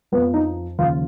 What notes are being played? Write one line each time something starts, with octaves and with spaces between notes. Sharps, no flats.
F2 F3 B3
D#4
D#2 C#3 F3 F4